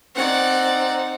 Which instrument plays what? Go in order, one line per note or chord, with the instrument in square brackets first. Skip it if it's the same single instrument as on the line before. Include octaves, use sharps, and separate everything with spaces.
[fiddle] C4 D#4 [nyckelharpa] D5 F#5